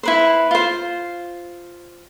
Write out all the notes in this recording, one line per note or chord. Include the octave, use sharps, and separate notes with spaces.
E4 B4 C5
F4 C5